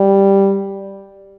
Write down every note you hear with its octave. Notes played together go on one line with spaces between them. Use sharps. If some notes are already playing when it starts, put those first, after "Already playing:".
Already playing: G3